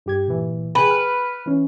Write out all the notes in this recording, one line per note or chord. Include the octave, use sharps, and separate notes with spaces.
G2 G4 G#6
A#2 E3
G#4 B4 G5 G#5
F6
E3 C#4